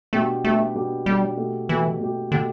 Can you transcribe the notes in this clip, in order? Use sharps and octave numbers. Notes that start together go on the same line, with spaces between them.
B2 A3 B3 D4 G4
B2 A3 B3 D4 G4
B2 B3 D4 G4
B2 G3 B3 D4 G4
B2 A3 G4
B2 E3 A3 G4
B2 A3 G4
B2 D3 A3 G4